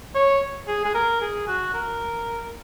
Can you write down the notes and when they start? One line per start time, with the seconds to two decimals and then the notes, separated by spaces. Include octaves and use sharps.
0.15 C#5
0.68 G#4
0.84 G#4
0.95 A#4
1.21 G#4
1.48 F#4
1.74 A#4